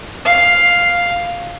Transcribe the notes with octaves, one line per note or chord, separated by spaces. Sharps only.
F5